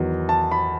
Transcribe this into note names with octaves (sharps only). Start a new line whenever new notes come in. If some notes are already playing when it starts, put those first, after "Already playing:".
Already playing: E2 D#3 F#3
A5
B5